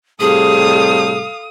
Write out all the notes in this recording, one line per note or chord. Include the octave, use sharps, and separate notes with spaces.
A2 C3 G3 G#4 A4 F5 D#6